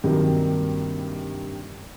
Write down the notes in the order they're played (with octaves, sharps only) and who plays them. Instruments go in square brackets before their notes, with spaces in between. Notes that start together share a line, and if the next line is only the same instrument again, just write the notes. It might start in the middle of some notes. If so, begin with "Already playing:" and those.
[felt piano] G2 C3 D#3 F#3 A#3 D#4